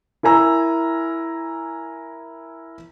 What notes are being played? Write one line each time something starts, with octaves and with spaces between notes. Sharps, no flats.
E4 A#4 G#5 A#5 E6